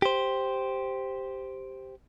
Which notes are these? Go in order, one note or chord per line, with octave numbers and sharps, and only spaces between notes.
G4 C5